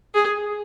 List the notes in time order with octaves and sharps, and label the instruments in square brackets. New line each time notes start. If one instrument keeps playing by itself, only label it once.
[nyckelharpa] G#4